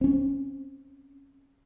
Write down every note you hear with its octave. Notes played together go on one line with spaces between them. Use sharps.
C4 C#4